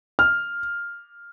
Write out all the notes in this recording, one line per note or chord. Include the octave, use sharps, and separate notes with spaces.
F6